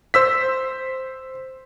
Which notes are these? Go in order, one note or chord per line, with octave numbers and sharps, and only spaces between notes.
C5 E6 B6